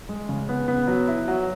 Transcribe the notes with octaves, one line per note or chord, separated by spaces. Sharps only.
G#3
C#3
B3
B3
F#3
E4
F#3